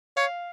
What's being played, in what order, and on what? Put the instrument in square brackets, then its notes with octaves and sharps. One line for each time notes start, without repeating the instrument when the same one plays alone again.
[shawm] C#5 [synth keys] F5